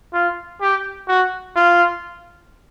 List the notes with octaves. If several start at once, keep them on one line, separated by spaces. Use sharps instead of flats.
F4
G4
F#4
F4